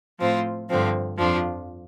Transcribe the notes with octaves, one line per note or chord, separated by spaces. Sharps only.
A2 F3 C4 F4
G2 D3 F3 C4
F2 F3 D4 F4